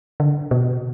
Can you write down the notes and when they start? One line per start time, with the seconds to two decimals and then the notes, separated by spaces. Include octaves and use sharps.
0.20 D3
0.51 B2